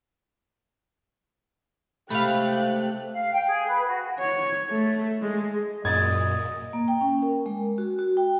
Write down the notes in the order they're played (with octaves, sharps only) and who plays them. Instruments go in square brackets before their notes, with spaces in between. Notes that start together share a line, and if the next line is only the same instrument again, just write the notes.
[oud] C3 G#3 [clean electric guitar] A3 [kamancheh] G4 F#6 [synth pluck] F5 B5
[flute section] F5
G5
G#4
B4
F#4
[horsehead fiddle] C#5
A3
G#3
[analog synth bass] F#2 [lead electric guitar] A#2 [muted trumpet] D#5 [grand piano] G#6 A6
[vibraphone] A#3
G5
C#4
A#4
G#3
F#4
F#4
G5